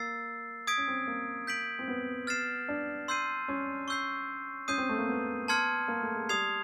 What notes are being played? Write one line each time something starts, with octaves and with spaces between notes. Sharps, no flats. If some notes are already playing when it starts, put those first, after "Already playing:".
Already playing: A#3 E6 A6 C7
D#6 G#6 B6 D7
C#4
C4
A#3
G6 B6 D7 F#7
C4
B3
F6 A6 C7 E7
D4
C6 E6 G6 C7 D#7
C#4
C#6 E6 G6 C7
C#4 D#6 G6 C7 D#7
C4
A3
A#3
B3
A5 C6 F6 G#6 C#7
A#3
A3
G#3
G3 D#6 G#6 C7 F7